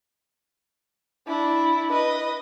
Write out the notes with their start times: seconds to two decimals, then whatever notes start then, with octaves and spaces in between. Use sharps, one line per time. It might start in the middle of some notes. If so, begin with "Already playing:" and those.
1.27 D4 E4
1.92 B4 D#5